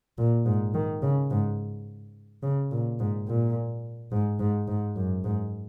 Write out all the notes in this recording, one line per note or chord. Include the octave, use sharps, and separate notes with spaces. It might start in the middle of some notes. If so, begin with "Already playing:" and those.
A#2
G#2
D#3
C#3
G#2
C#3
A#2
G#2
A#2
G#2
G#2
G#2
F#2
G#2